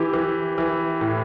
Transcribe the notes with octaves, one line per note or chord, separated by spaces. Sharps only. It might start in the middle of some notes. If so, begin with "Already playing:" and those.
Already playing: E3 E4 G4
E3
E3
A2